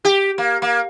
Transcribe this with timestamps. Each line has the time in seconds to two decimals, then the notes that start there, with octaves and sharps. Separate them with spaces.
0.05 G4
0.38 A#3
0.62 A#3